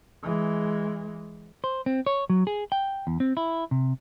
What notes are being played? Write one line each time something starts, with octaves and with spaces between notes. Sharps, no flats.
E3 G#3
C5
C4
C#5
F#3
G#4
G5
E2
C4
E4
C3